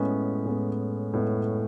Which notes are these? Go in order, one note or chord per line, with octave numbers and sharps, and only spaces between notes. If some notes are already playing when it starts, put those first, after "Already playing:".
Already playing: A2 G#3 B3 C#4
A2 G#3 B3
A2 G#3 B3